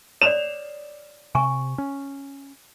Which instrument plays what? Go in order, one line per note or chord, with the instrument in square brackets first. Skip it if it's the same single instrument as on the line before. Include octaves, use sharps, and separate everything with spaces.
[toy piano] C#5 D5 [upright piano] E7 F7
[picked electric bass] C3 [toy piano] G#5 C#6
[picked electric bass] C#4